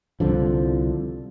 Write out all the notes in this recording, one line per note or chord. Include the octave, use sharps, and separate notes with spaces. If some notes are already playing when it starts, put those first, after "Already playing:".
C2 D3 F3